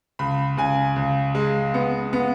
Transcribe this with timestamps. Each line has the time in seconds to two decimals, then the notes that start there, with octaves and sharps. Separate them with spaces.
0.19 C#2 B5
0.57 C#2 G#5
0.96 C#2
1.35 G#3
1.74 B3
2.13 B3